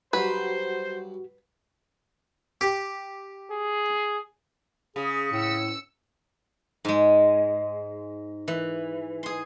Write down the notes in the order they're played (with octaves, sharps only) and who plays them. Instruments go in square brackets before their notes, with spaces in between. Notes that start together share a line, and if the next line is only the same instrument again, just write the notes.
[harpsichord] G2 F#3 [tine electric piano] F#4 [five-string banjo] B4 [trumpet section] C5
[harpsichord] G4
[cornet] G#4
[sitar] C#3 [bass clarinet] G#4
[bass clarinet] A2 [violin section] E6 C#7
[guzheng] G#2 G#3
E3
G#4 C6